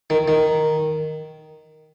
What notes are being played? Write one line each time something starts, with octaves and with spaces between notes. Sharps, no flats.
D#3
D#3